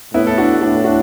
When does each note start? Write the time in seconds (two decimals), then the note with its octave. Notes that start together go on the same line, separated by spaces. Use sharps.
0.14 A2 B3 E4
0.27 A4
0.38 D4 F#4
0.61 A2 D4 F#4
0.84 D4 F#4